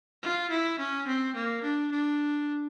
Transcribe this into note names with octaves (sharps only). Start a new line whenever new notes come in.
F4
E4
C#4
C4
A#3
D4
D4